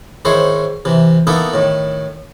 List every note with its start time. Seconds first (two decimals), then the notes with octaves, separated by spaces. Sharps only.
0.25 G#2 D#3 E4 C5 C#5
0.85 C3 E3
1.27 A#3 B3 D#4 E4 A4 B4
1.54 A2 D#3